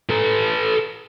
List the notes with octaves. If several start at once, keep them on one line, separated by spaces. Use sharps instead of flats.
A4 B4